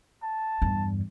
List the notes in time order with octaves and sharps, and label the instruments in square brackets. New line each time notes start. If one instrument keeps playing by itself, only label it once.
[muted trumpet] A5
[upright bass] E2 G2